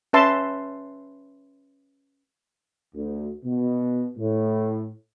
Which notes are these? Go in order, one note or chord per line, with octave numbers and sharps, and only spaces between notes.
C#4 B4 E5 A5 C6
D2
B2
A2